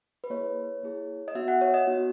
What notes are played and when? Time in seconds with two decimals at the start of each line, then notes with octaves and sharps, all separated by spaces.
0.24 B4
0.30 A#3 E4 G#4 C#5
0.83 A#3 E4 G#4
1.28 D#5
1.35 B3 D#4 F#4 E5
1.48 F#5
1.61 C#5
1.74 D#5
1.87 B3 D#4 F#4